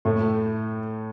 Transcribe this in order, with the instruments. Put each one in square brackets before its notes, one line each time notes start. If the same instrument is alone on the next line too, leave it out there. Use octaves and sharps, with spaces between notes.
[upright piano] A2 A3